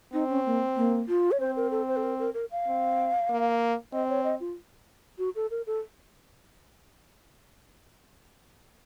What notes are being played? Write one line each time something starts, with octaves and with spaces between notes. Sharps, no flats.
C4 D#4
C#4
A#3
A#3
F4
C#5
C4 C5
A#4
A4
C5
A4
A#4
A#4
A#4
F5
C4
A#3
C4 D#5
C#5
D#5
F4
F#4
A4
A#4
A4